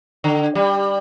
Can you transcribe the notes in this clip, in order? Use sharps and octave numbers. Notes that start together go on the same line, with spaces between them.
D3
G3